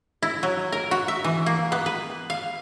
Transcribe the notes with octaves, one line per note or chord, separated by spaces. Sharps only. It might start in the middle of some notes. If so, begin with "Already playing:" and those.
E4
F#3
A#4
F#4
E5
E3
A#3
B3
B4
F5